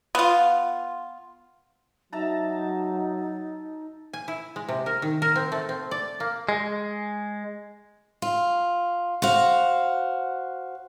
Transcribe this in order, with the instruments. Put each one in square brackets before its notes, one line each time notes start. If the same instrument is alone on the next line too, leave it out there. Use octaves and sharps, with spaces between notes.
[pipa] B3 F4
[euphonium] F#3 [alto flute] D#4 [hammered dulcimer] E5 A5 A#5
[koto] G#5
E4
G#3
C3
A#4
D#3
A#4
C4
A3
C4
D5
A#3
[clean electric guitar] G#3
[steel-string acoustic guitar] F4
F#4 C5 F5